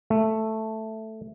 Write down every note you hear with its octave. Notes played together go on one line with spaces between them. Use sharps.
A3